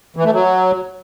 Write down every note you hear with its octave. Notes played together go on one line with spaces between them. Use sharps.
E3
A3
F#3